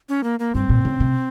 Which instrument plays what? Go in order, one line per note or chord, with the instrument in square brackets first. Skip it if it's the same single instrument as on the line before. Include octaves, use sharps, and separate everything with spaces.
[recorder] C#4
A#3
A#3
[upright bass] G2 [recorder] C4
[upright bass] A#2
C#3
C3